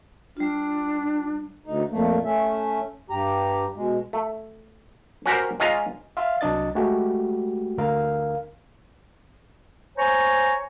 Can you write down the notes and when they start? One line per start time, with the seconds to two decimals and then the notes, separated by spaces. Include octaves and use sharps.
0.37 G3 D4 F4
1.66 D2 D#4
1.92 F2 A#2 A3 A#3
2.24 A3 C#4 E5
3.10 G2 G4 A#5
3.76 B2 G#3
4.13 A3
5.26 C#4 F#4 G4 A#4 C5
5.60 G#3 C#4 F4 D#5 A#5
6.17 E5 F5 C6
6.41 C2 F#3 D4 D#5 A6
6.75 G#3 A3 F#4 G4
7.78 D2 D3 A#4 F5
9.97 C5 C#5 G#5 A#5 C#6